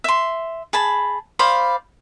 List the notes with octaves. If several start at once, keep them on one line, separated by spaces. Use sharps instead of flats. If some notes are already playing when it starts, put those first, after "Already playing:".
E5 C6
G#4 A5 B5
C5 D5 F5 B5